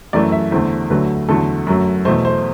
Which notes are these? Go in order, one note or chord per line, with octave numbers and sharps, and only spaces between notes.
F#2 E3 A3 D5
E5
E2 D3 A3 C5
D2 D3 F#3 A3 B4
E2 D3 F#3 A3 A4
F#2 F#3 A3
E2 B2 A3 C5
C5